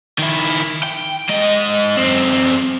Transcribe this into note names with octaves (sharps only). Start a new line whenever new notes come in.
D#3 E4
G5
G#2 D#5
F#2 C4